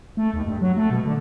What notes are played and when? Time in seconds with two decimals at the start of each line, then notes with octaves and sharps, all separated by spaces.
0.17 A3
0.34 D#2
0.47 G2
0.61 F#3
0.77 A3
0.90 B2
1.06 D3